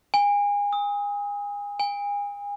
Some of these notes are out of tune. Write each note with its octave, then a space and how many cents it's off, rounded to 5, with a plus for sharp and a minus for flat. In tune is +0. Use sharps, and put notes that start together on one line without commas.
G#5 -30
D#6 +30
G#5 -35